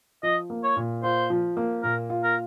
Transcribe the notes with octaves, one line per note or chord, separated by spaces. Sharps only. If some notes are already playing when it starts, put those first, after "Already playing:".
F3 D#5
A#3
C#5
A#2
F4 C5
F3
A#3
A#2 A#4
F4
A#4